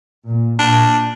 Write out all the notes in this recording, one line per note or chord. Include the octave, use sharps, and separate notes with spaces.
A#2
A#2 D4